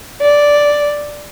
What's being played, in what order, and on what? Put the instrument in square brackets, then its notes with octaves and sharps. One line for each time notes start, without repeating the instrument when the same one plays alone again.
[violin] D5